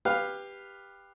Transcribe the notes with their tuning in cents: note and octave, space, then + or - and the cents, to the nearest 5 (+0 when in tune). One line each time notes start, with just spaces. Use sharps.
G4 +15 B4 +0 F5 +0